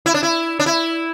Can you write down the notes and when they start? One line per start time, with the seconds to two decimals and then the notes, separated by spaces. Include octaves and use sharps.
0.06 E4
0.14 D4
0.23 E4
0.60 D4
0.66 E4